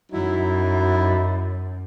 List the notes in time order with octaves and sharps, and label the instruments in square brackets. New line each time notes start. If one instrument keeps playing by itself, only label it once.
[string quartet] F#2 [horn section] F#3 D#4 E4